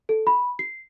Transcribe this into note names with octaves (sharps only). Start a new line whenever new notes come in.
A4
B5
C7